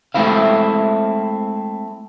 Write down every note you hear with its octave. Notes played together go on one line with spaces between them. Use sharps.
G#3 A3 C4 E4 F5